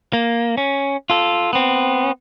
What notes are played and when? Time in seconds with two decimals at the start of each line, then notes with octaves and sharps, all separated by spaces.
0.13 A#3
0.57 C#4
1.10 F4 A4
1.53 B3 C4